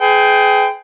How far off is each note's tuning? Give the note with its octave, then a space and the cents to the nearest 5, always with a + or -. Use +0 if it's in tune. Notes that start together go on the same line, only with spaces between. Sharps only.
G#4 +20 B4 +45 G5 +0